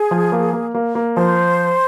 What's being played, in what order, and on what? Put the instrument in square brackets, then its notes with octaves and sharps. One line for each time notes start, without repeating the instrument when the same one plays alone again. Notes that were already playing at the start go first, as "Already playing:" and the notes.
Already playing: [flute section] G#4
[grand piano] F3
A#3
A#3
A#3
A#3
[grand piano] F3 [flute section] C5